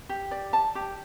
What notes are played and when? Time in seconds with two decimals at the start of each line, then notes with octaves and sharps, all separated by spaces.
0.09 G4
0.31 D5
0.53 A5
0.75 G4